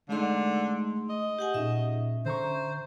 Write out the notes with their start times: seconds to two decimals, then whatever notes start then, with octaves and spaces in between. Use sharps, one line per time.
0.09 D3 G#3 A3 D#4 G#4 C6
1.10 D#5
1.39 G4 F#5 G#5
1.54 A#2 C#4 D#4 G#4 E5
2.26 D3 C5 A#5 C#6